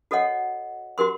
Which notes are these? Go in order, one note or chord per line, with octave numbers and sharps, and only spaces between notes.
F#4 A4 C#5 D#5 F#5
F#4 G4 A#4 C6